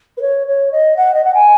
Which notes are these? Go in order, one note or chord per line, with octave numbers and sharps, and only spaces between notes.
B4
C#5
C#5
D#5
F#5
D#5
F#5
G#5